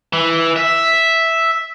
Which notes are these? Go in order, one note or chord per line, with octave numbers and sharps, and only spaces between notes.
E3
E5